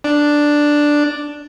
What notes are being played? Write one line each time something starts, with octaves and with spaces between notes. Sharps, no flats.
D4